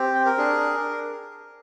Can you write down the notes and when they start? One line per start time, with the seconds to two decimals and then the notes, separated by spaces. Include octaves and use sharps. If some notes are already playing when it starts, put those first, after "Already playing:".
Already playing: C4 G4
0.15 G5
0.26 A#4
0.38 D4 G#4